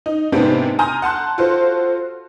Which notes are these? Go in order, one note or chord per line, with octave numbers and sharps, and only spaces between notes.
D#4
G#2 C3 A#3 B3 D4 G4
G#5 A#5 C6 D#6 F6 G6
F#5 A5 C6 F#6
F4 F#4 A4 C5